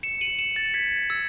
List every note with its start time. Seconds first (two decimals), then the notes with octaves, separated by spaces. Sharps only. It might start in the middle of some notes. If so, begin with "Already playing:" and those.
0.03 C#7 E7
0.21 D#7 F#7
0.39 C#7 E7
0.56 A6 C#7
0.74 G#6 B6
1.10 E6 G#6